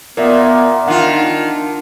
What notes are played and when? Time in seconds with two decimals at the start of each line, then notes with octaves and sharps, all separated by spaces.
0.17 A#2 B3 A#4 D5 E5
0.88 D#3 D4 F4 F#5